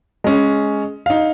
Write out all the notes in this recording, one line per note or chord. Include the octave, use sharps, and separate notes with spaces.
G#3 C#4
D#4 F5